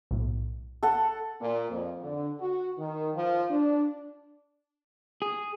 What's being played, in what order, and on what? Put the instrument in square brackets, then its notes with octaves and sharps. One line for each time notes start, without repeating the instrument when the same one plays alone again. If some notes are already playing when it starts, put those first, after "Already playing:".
[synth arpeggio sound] B1 A2
[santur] A4 F#5
[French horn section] A#2
F2
D3
F#4
D#3
F3
D4
[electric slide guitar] G#4